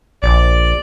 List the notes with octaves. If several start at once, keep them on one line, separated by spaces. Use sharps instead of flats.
A#1 D5